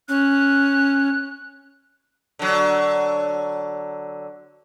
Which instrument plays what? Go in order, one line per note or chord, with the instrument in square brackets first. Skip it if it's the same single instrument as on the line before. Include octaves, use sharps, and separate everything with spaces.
[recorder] C#4 [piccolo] F#6
[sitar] D3 F#3